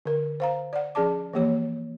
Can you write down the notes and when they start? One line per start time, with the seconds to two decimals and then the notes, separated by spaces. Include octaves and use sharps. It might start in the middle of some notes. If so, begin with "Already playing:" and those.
0.06 D3 A#4
0.40 C5 F5 A#5
0.73 D5 F#5
0.95 F3 C#4 G#4 D5 A5 D6
1.33 E3 F3 A#3 G4 C#5